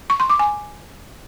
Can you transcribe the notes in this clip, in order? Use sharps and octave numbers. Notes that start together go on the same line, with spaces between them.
C#6
C6
D6
G#5